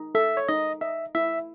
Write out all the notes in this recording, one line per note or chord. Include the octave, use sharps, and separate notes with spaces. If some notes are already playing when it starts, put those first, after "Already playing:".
Already playing: D#4
A4 E5
C#5
D#4 D#5
D#5 E5
E4 E5